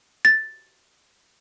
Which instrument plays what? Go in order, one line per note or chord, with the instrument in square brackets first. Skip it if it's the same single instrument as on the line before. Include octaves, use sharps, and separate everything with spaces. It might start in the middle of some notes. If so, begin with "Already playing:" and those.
[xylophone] A6